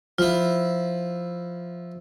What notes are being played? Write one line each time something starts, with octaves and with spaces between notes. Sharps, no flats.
F3 E4 F4